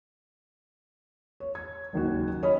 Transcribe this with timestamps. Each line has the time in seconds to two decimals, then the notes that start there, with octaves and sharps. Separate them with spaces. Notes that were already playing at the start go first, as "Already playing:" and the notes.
1.40 C#5
1.55 G#6
1.93 F#1 D#2 F#4
2.43 C#4 C#5 D#5 B5